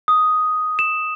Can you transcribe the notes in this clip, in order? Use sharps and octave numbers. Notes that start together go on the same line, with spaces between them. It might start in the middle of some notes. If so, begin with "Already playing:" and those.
D#6
E7